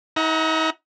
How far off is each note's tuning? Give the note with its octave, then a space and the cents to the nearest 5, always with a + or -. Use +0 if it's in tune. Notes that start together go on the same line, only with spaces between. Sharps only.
D#4 +45 F#5 +0 A#5 +0